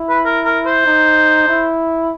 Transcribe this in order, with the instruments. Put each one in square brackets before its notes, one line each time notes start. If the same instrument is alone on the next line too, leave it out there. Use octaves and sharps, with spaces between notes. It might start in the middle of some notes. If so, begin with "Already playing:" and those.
Already playing: [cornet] E4
[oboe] B4
A#4
A#4
C5
[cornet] D#4
E4